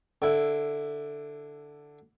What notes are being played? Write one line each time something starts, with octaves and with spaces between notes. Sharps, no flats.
D3 E4